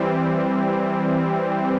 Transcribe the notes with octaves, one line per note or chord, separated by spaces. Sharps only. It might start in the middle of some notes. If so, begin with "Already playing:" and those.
Already playing: E3 G3 C4